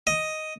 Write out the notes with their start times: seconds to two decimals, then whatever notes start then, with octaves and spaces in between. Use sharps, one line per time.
0.07 D#5